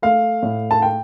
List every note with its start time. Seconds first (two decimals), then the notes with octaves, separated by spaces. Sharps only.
0.02 A3 F5
0.43 A2
0.71 A5
0.82 G5